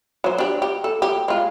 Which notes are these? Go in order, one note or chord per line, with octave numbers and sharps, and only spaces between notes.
F#3 C5
D4 G4
G4
A4
G4
G#3 F4